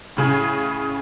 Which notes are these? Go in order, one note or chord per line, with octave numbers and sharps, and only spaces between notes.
A2 C#3 G#4